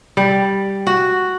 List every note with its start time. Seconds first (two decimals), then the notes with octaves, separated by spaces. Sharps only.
0.17 G3
0.87 F#4